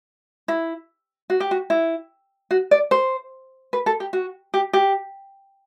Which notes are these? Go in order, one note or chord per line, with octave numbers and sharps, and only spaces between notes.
E4
F#4
G4
F#4
E4
F#4
D5
C5
B4
A4
G4
F#4
G4
G4